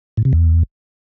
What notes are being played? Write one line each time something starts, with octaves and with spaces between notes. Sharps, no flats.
A2
C3
E2